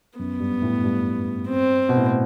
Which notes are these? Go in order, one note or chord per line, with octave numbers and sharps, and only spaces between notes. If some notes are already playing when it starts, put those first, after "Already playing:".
F#2 B3
G2
A2
G2
C4
B2
A2